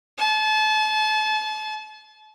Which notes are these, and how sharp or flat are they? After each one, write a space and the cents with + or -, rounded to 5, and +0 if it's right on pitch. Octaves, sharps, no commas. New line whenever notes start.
A5 -35